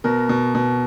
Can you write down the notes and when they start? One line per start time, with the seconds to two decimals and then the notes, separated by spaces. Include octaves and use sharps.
0.04 B2 A#4
0.29 B2
0.55 B2